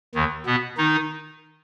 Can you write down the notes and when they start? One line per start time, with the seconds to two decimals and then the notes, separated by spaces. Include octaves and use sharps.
0.15 D#2 D#3
0.46 B2 B3
0.77 D#3 D#4